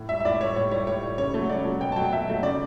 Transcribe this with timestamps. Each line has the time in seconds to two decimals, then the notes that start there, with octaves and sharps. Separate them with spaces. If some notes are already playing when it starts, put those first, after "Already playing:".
Already playing: A2
0.09 G3 E5
0.20 E5
0.25 A2 D5
0.41 G3 C#5
0.56 A2 C#5
0.71 G3 C#5
0.87 A2 C#5
1.03 G3
1.18 C#3 C#5
1.34 F#3 A3
1.49 C#3 D5
1.65 F#3 A3
1.81 B2 G5
1.92 A5
1.96 F#3 G5
2.00 A3
2.12 B2 E5
2.28 F#3 A3
2.43 C#3 D5